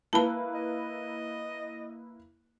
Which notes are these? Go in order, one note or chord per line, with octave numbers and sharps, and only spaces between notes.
A#3 E4 B4 A5 B5
D#5